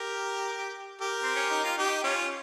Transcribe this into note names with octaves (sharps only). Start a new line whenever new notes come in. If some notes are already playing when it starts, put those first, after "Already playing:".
Already playing: G4 A#4
G4 A#4
C4
C#4
D#4
F4
D#4 G4
C#4 F4